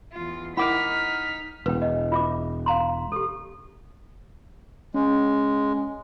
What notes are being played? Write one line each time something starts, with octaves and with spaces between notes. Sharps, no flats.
E2 F4
D#4 E4 A#4 F#5 B5 D6 F6 B6
E1 B4 G5
D#5
F4 E5 D6
F5 A#5 C6
G4 A4
G#3 C#4